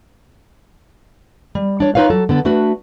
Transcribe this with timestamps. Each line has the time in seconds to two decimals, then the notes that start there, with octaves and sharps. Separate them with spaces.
1.55 G3
1.80 D4 C#5
1.95 D#4 F4 B4 C#5 F5
2.10 F#3 A4
2.29 D3 B3 A4
2.45 A3 D4 F#4 B4